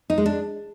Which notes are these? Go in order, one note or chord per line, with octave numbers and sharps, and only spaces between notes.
D#4
G#3
D4